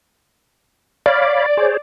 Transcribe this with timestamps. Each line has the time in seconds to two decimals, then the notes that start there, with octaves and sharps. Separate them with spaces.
1.06 C#5 D5 F5 B5
1.57 G#4 C5 C#5